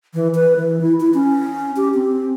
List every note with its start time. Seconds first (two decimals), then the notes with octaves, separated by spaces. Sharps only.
0.14 E3
0.35 B4
0.56 E3
0.81 E4
1.00 E4
1.14 C#4
1.77 G4
1.94 C4